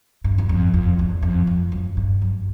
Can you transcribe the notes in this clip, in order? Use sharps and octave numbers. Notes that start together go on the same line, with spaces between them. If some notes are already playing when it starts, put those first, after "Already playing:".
G2
E2
F2
F2
E2
F2
F2
F#2
G2
F#2